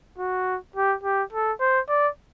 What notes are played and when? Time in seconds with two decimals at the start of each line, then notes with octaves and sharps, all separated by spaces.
0.18 F#4
0.76 G4
1.03 G4
1.33 A4
1.60 C5
1.89 D5